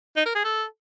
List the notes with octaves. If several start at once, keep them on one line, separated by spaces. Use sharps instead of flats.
D#4
A#4
G#4
A4